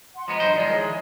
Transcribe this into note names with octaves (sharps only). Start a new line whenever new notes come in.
F#5 C6
F3 G#3 B3 D#5 A#5
G2 F#3 C5
D#3 F3 G#3 A#4 D5 D#5
E4 G#4 C#5